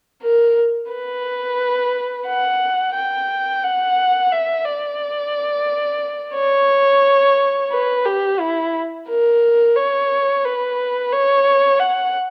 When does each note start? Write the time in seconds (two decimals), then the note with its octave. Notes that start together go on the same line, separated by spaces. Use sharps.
0.22 A#4
0.91 B4
2.27 F#5
2.95 G5
3.64 F#5
4.32 E5
4.65 D5
6.36 C#5
7.72 B4
8.05 G4
8.40 E4
9.08 A#4
9.76 C#5
10.45 B4
11.12 C#5
11.80 F#5